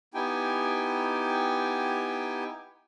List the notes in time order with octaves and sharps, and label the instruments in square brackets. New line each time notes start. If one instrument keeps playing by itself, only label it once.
[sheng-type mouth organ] B3 D#4 E4 G4 G5 G#5